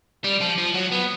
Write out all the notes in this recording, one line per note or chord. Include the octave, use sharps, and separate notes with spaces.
G3
F3
F3
F#3
B3